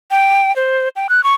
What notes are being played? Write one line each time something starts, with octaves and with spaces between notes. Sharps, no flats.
G5
C5
G5
F#6
C#6